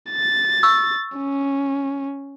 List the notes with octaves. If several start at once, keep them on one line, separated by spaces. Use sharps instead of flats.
A6
C#6 E6
C#4